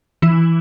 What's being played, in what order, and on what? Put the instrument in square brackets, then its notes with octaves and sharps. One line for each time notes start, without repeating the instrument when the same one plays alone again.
[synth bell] E3 E4